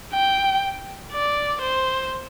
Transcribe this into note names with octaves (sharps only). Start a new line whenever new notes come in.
G5
D5
C5